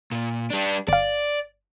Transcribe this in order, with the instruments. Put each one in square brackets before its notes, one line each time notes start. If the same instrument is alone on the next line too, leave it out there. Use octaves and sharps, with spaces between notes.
[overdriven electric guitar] A#2
G3 D4
[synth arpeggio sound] G1 F5 [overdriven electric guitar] D5